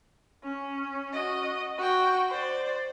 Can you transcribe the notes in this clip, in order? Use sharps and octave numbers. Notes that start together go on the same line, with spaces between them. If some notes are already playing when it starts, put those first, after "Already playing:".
C#4
F#4 D#5
F#4 G5
C5 D5